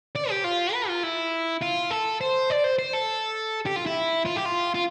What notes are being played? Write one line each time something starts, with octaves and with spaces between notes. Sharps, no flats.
D5
G4
F4
B4
F4
E4
F4
A4
C5
D5
C5
C5
A4
G4
F4
E4
F4
G4
F4
F4